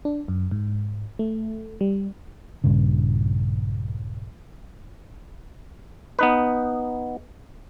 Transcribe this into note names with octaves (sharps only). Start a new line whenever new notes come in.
D4
F#2
G#2
A3
G3
A#1 G2 C#3
B3 D#4 B4